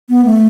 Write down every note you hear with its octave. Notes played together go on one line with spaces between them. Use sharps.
B3
A3